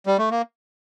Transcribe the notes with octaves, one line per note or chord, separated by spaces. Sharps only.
G3
A3
A#3